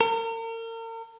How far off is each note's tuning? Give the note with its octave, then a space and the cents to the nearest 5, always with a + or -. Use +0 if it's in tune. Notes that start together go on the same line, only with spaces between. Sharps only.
A#4 -40